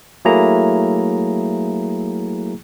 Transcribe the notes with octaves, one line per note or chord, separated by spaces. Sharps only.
F#3 A3 A#3 E4 G#4 A#5